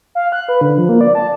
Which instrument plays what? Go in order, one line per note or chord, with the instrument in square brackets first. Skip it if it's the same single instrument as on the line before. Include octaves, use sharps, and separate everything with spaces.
[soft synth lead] F5
F#6
B4
D3
F3
A#3
D5
A5